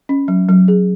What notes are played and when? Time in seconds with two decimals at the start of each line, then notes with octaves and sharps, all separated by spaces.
0.09 C#4
0.28 F#3
0.49 F#3
0.68 G#4